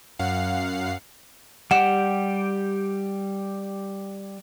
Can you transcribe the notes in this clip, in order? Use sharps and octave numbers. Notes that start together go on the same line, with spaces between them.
F#2 F5 F#5 C7
G3 G4 F#5 E7